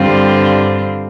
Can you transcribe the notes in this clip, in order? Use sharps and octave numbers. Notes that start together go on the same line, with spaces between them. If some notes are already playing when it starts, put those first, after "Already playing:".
Already playing: G2 D3 G3 C4 F4